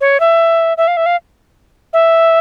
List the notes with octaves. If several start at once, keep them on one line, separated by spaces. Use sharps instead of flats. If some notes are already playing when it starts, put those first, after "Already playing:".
C#5
E5
E5
F5
E5
F5
E5